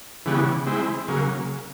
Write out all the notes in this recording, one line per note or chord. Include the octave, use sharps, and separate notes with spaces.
C#3 E3 G3 B3
G#3 C4 E4
C#3 F#3 A#3